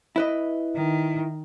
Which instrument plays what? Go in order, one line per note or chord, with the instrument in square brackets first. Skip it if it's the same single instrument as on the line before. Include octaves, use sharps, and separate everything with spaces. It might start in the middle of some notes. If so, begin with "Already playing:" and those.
[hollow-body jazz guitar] E4 B4 D#5
[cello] D#3